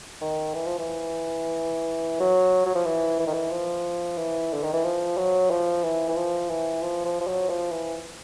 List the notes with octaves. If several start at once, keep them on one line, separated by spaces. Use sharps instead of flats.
D#3
E3
F3
E3
F#3
F#3
F3
E3
E3
D#3
E3
F3
E3
D3
D#3
E3
F3
F#3
F3
E3
E3
F3
E3
F3
F3
F3
F#3
F3
E3